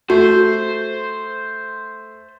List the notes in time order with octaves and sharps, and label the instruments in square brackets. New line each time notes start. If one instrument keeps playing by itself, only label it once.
[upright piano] A3 [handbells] F#4 [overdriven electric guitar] C5